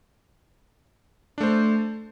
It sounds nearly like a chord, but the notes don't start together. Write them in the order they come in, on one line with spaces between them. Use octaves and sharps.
D4 A3 C5